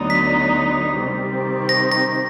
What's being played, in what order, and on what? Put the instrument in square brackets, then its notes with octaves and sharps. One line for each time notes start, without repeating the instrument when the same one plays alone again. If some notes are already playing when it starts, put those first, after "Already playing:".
Already playing: [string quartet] D2 D3 F#3 B3 D#4
[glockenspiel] B6
[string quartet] C3 D#3 G3 C4
[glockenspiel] A#6
A#6